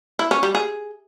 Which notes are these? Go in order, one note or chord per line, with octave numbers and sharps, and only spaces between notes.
E4
C#4
G3
G#4